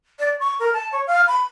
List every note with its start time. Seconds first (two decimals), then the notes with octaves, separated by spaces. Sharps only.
0.19 D5
0.40 C#6
0.60 A#4
0.73 A5
0.92 C#5
1.07 F5
1.28 B5